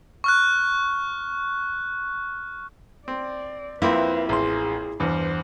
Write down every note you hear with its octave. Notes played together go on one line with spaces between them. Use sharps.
C#6 F6 F#6
C4 D5
F2 A#3 C4 E4 B4 E5
A1 G#4 C6
E2 G2 C5